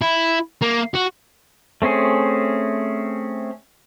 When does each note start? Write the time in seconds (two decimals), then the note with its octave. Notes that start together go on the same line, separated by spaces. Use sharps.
0.01 E4
0.62 A#3
0.94 F#4
1.82 A3 C4 C#4 G#4